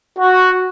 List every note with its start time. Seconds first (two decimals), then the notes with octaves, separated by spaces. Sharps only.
0.19 F#4